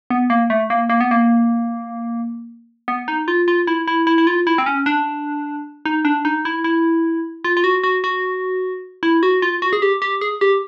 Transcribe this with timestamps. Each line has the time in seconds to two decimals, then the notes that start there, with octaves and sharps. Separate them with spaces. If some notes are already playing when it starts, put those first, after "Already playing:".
0.10 B3
0.30 A#3
0.50 A3
0.70 A#3
0.89 A#3
1.01 B3
1.11 A#3
2.88 B3
3.08 D#4
3.28 F4
3.48 F4
3.67 E4
3.88 E4
4.07 E4
4.18 E4
4.27 F4
4.47 E4
4.58 C4
4.66 C#4
4.86 D4
5.85 D#4
6.05 D4
6.25 D#4
6.45 E4
6.64 E4
7.44 F4
7.57 F4
7.64 F#4
7.84 F#4
8.04 F#4
9.03 E4
9.23 F#4
9.42 F4
9.62 F#4
9.73 G#4
9.82 G4
10.02 G4
10.21 G#4
10.41 G4